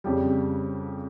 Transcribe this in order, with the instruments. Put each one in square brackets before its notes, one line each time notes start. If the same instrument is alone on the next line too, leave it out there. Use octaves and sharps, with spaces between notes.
[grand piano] F2 C#3 G3 G4